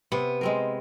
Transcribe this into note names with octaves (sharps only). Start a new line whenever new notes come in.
C3 B3
G#3 C4 A#4